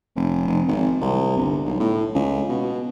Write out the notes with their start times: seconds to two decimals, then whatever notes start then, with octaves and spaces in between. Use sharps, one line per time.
0.16 F1
0.47 F1
0.68 G#1
1.01 C2
1.37 G1
1.66 B1
1.80 A2
2.15 C#2
2.49 B2